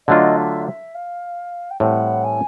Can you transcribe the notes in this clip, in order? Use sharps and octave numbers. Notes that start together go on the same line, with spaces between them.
D3 F#3 A3 D4 F4 D#5
E5
E5
F5
G5
A2 E3 G3 C4 F#5
G#5